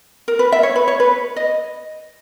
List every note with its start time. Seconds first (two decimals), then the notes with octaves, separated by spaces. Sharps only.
0.28 A#4
0.39 B4
0.52 E5
0.63 C#5
0.76 B4
0.88 C#5
1.00 B4
1.36 D#5